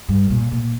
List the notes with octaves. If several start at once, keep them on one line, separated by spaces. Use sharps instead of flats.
G2
A#2
A#2